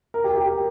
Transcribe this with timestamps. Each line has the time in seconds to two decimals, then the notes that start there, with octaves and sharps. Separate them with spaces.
0.14 A#4
0.24 G4
0.36 G4
0.46 A#4